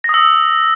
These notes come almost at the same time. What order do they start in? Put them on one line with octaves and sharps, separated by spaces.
A#6 D#6 E6